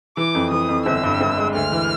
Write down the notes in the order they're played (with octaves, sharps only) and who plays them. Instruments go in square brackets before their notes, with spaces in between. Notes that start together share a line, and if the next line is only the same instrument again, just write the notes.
[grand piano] E3 [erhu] D6
[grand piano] F2
[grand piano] E3 [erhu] D#6
[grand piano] F2
[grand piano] G1 [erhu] E6
[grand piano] G2
G1
G#3
[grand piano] D2 [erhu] F6
[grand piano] E3